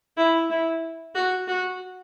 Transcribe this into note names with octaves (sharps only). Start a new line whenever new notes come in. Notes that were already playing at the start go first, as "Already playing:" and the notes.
E4
E4
F#4
F#4